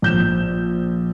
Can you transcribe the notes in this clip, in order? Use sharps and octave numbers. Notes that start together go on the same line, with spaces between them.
A#1 G6 E7